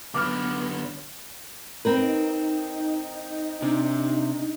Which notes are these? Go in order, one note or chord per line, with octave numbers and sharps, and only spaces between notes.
F#2 D3 B3 D6 F6
C4 D#4 A#4 B4
C3 D4